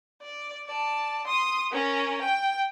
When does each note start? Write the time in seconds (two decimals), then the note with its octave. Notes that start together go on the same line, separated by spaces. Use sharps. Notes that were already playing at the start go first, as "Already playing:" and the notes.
0.22 D5
0.67 D5 A5
1.27 C6 D#6
1.72 C#4 A#4
2.22 G5